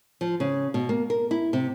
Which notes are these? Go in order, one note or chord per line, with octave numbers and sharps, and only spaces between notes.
F3
C#3
B2
A#3
A#4
E4
C3